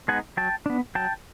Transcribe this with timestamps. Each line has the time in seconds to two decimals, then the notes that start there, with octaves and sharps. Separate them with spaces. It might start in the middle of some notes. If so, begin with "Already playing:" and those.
0.08 G#3 B3 D#4 F#5 G#5
0.37 F#3 G5 A5
0.66 B3 D4
0.95 F#3 G5 A5